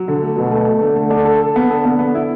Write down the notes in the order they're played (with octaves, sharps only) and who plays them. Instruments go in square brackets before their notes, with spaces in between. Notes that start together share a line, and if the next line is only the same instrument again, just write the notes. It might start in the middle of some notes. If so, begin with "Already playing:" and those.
Already playing: [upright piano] F#3
D3
A3
[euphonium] B2 [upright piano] F#3
[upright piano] A3
A3
[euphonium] D3 [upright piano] A3
[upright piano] A3
D4
A4
A4
B3
[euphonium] D3 [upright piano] A4
[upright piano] B3
B3
E4